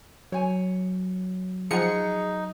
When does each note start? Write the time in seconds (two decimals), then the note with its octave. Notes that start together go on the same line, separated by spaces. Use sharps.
0.32 F#3 C#5 G#5
1.71 F3 D#4 G#4 F#5 C#7